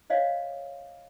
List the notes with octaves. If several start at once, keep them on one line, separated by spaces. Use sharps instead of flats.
C5 C#5 D#5 F5